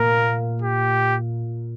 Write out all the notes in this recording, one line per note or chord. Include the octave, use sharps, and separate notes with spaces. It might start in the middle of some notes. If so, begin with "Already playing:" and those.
Already playing: A#2 A#3 A#4
G4